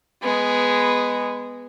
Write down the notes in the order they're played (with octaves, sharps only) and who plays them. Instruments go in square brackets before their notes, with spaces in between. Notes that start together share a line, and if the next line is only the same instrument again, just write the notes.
[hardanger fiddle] G#3 B3